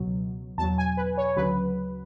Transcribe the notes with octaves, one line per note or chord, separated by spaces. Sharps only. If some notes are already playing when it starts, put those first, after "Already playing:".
Already playing: C#2 B2 F#3
E2 B2 F#3 A5
G#5
B4
C#5
D2 C#3 F#3 B4